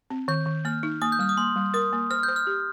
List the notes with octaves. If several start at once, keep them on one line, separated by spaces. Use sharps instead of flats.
C4
D#3 G6
D#3
A#3 F6
D#4
A#3 D#6
G6
G3 F6
D#6
A#3 C6
G3
A#4 D#6
A#3
C5 F6
G6
C5
F6
G4